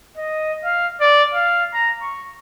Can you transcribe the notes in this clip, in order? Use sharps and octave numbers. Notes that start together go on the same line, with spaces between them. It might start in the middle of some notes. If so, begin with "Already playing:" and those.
D#5
F5
D5
F5
A#5
C#6